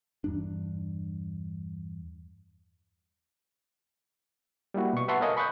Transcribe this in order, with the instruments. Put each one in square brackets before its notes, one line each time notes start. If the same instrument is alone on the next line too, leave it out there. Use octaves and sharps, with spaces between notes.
[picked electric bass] E2 G2 D4
[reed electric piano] G3 A#3 E4 F#4
B2 C#6
B4 E5 F#5 A5 C6 C#6
A4 A#4 C#5 D#5 F5 G#5
B5 C#6 D#6 F#6 G6